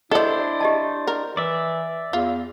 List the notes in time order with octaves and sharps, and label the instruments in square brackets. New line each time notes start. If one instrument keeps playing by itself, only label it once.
[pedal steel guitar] D4 C5 [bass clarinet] E4 [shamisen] A4 D5 [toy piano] D#5
[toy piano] G4 D#5 A5
[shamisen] A#4
[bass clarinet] E3 [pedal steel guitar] D5 E5
[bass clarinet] E2 [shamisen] F4